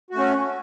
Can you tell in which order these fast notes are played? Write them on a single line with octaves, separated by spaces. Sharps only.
F#4 A3 C#4